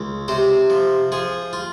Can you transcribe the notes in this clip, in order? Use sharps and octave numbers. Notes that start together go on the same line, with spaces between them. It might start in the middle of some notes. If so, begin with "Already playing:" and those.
Already playing: C#2
C3 C5
F3
F3 G#4
F4